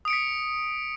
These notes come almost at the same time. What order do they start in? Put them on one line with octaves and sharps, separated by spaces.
D#6 D7 C#7 B6